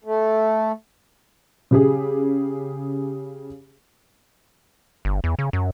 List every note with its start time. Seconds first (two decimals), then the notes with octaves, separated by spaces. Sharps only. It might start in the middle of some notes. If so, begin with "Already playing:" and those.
0.04 A3
1.71 C#3 G4 G#4
5.05 G1
5.24 E2
5.39 C#3
5.53 F#2